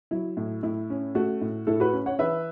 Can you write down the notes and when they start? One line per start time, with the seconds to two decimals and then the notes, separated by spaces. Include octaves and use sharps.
0.11 F#3 E4
0.37 A2
0.63 A2 E4
0.90 C#4
1.15 A3 F#4
1.41 A2
1.67 A2 E4 A4
1.80 F#4 B4
1.93 C#4
2.06 C#5 F#5
2.19 E3 B4 E5